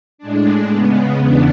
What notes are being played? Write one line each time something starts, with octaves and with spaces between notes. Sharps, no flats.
A2 G#3 D4
C#3 G#3 B3
E2 C#3 E3 B3 D4